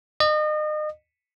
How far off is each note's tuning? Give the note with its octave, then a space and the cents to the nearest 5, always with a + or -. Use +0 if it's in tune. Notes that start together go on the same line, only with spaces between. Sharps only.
D#5 -35